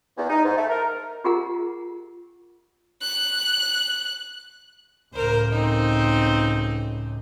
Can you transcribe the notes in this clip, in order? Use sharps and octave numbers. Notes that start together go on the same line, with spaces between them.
E2
D#4
G#2
A3
A#4
F4 G4 G#4 A#4 F#5 A#5
F#6
C#2 A2 A#4 C5
C4 D#4